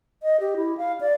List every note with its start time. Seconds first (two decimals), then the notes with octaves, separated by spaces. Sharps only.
0.23 D#5
0.40 G4
0.57 E4
0.78 F5
1.01 D5